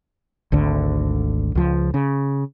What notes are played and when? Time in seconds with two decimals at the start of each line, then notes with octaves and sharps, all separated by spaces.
0.52 G#1 D2 D3
1.55 C#2 F3
1.94 C#3